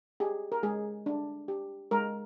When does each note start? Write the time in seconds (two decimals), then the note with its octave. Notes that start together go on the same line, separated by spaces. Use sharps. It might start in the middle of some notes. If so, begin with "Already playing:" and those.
0.20 G4 G#4
0.52 A#4
0.63 G#3 G#4
1.06 D4
1.48 G4
1.91 G#3 A#4